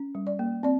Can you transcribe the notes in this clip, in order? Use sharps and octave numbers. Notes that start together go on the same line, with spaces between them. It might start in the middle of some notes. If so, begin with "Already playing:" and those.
Already playing: C#4
G3
D5
A#3
C4 D5